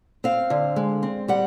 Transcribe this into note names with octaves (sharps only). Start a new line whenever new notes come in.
C4 F5
D3
G#3
C4
G3 F#5